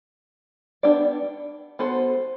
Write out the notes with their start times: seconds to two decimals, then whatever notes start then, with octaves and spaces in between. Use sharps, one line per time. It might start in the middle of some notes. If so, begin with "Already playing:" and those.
0.83 B3 D4 G4 D5
1.79 B3 F#4 A4 C5